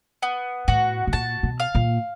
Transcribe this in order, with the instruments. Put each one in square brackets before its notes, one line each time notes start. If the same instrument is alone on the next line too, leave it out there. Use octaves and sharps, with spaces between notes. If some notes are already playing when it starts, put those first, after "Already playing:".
[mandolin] B3
[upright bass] A2 [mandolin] F#4
[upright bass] B2
[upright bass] A#2 [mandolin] A5
[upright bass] B2
[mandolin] F5
[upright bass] A#2